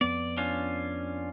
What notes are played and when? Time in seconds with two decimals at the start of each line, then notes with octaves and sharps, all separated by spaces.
0.01 F2 B3 D5
0.37 C#4 D4 F4